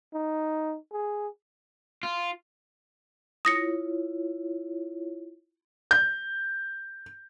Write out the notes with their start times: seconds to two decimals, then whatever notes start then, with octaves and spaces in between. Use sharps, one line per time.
0.13 D#4
0.92 G#4
2.03 F4
3.45 E4 F4 C#5 D#6 A#6 C#7
5.91 G6